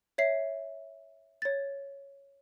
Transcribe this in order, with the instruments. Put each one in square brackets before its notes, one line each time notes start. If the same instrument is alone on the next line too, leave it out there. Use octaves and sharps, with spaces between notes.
[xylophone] C#5 E5 C7
C#5 A6